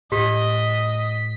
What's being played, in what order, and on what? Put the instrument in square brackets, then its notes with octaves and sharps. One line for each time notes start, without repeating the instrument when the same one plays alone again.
[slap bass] A2 [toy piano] G4 [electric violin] D#5 [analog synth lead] B6